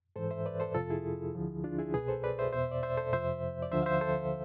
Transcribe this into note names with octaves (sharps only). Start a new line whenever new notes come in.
G#2 E3 A4 C5
C5 E5
B4 D5
A4 C5
F2 C3 F3 F4 A4
E4 G#4
D2 D3 F3
D4 F4
E4 G#4
C2 B2 G#4 B4
A4 C5
B4 D5
C5 E5
E2 B2 C5 E5
D5
C5 E5
A4 C5
F2 C3 F3 C5 E5
D5
D2 D3 F3 C5 E5
F5
C5 E5
A4 C5